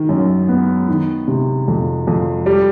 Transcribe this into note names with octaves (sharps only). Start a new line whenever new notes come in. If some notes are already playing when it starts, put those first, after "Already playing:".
Already playing: D#3
F#2
B3
D#3
C3
F2
F2
G3